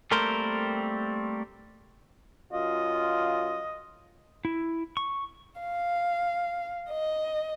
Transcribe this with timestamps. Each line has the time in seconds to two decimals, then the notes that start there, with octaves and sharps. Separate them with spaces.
0.11 G3 A3 A#3 C4 A#4 C5
2.53 F#2 F4 D#5
4.45 E4
4.97 C#6
5.61 F5
6.91 D#5